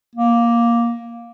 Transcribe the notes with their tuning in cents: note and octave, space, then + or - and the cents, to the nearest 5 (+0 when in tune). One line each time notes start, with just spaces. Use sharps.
A#3 +10